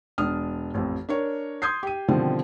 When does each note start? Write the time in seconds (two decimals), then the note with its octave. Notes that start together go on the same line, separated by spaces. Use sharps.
0.18 E1 D4 D#6 F6
0.74 A1 F2
1.09 D4 A#4 C#5
1.62 C6 D#6 G6 G#6 C7
1.83 G4 D#7
2.08 B2 D3 D#3 F3 G3 C4